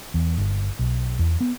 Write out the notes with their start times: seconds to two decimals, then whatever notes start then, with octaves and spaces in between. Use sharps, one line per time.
0.14 E2
0.38 G1
0.79 B1
1.19 E2
1.41 B3